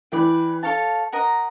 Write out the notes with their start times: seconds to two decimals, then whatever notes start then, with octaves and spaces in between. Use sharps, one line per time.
0.12 E3 B4 D5 G5
0.63 A4 C#5 F5 A5
1.12 A#4 D#5 F#5 A#5